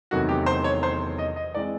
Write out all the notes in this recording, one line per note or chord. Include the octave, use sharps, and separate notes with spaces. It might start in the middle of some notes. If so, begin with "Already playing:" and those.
E2 C3 D#3 F#3 A3 F#4
G4
C5
C#5
C5
D#5
D#5
E3 G#3 C4 D5